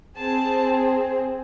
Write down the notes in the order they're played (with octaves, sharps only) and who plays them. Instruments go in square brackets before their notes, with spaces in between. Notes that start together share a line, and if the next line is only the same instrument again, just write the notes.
[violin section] C4 G#4 A5